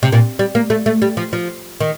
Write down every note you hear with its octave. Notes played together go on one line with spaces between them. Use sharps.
C3
A#2
G3
A#3
A3
A3
G3
F3
F3
D#3